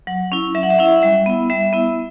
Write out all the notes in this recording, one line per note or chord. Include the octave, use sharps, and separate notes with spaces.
F#3 F#5
C#4 E4
F#3 E5
F#5
E5
C#4 E4 F#5
E5
G3 E5
B3 E4
G3 E5
B3 E4